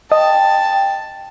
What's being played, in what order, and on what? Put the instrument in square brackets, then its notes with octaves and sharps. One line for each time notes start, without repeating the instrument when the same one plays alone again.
[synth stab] D#5 [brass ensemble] G5 [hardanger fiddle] A5